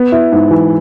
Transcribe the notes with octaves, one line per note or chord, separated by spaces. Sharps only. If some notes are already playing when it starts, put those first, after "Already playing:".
Already playing: B3
E4
G#2
E3